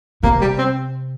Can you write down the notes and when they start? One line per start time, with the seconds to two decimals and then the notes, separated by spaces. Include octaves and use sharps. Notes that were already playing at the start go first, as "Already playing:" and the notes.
0.23 C3 A#3
0.41 G3
0.58 C4